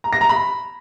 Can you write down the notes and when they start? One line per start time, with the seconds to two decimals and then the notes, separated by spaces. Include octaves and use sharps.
0.04 A#5
0.13 A#6
0.21 A#5
0.29 B5